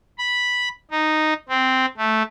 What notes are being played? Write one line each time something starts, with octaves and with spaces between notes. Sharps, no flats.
B5
D#4
C4
A3